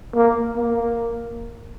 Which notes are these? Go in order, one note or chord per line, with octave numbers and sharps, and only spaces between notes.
A#3
A#3